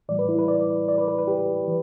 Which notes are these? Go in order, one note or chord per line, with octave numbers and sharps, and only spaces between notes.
A2 E3 G3 D5
B4
E4
B4
D5
D5
B4
B4
B4
G4
E3